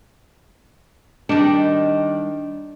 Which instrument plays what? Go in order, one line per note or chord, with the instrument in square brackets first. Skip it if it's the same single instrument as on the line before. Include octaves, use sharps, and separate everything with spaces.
[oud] D#3 G3 [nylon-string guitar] D4